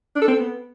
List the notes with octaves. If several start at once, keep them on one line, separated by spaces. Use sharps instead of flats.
D4
A4
C4
A4
B3